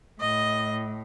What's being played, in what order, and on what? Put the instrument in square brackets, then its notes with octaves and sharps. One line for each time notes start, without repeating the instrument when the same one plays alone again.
[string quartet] A2 D#5